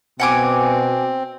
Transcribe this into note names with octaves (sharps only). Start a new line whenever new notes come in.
B2 C4 F#5 G#5 D6